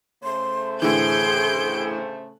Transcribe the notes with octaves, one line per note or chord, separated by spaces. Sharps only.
C#3 A3 C5 C6
A2 D3 E3 G#4 C6 G6 D7